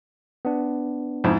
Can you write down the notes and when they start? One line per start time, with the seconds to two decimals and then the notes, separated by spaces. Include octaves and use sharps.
0.45 B3 D4
1.24 F2 G#2 E4